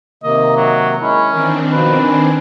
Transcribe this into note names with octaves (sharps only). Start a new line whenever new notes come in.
C3 D#3 A#3 D#5
F#3
G#3 C#4 E4
D#3 E3 C4 D4 A#4
B2 F3 B4
G#5